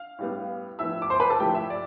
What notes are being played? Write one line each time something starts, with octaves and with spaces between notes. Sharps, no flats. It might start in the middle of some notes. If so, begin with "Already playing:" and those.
Already playing: F5 F6
A2 G3 B3
A2 F3 B3 E5 E6
D6
C5 C6
B4 B5
A4 A5
A2 F3 A3 G4 G5
E5
D5